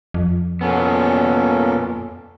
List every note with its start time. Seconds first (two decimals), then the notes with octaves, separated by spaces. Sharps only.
0.14 F2
0.61 A#2 B3 C#4 A4